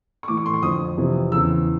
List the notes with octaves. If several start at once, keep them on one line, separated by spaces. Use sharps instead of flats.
C#6
A2 E3 D6
C#6
C6
C#6
F2 D3 D#6
F2 C3 E3
E2 C#3 E3 E6